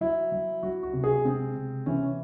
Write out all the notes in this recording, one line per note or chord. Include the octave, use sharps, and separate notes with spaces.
F#3 E4
F#3
F#3 F#4
F#4
C3
G#4
G#3 C4
C3
E3 C#4